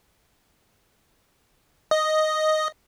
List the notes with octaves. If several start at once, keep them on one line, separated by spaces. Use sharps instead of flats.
D#5